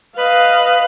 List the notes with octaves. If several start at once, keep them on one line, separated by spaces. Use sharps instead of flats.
B4 D#5 F5